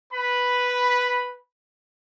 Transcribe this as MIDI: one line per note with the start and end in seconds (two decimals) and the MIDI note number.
0.13 1.37 71
0.13 1.37 83